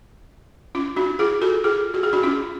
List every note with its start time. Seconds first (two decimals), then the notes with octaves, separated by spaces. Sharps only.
0.75 C#4 F4
0.96 D4 F#4
1.19 F4 G#4
1.41 F#4 A4
1.64 F4 G#4
1.94 F#4
2.03 G#4
2.13 D4 F#4
2.23 C#4 F4